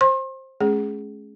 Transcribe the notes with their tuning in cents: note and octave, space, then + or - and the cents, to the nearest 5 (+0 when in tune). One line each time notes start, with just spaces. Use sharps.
C5 +15 C6 +40
G#3 +45 C#4 +0 G#4 +0